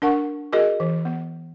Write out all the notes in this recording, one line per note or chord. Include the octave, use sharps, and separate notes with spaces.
D4 A#4 F#5 C#6
F#4 G#4 A#4 D#5
E3
B3